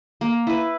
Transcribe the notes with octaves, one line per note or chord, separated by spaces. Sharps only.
A#3
E4 B4